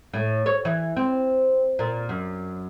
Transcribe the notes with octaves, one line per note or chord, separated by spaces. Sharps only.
A2
C#5
E3
C4
A#2
F#2